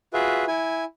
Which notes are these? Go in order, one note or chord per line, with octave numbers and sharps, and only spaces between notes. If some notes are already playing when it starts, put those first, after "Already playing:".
F4 F#4 G#4 B4 E5
E4 G#5